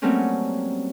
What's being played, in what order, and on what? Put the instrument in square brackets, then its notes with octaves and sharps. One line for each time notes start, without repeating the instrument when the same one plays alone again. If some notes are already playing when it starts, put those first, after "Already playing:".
[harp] F#3 G3 A3 A#3 C4 C#4